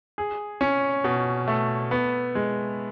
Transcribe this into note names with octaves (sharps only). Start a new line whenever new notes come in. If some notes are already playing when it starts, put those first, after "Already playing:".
G#4
C#4
B2
A3
B3
G#3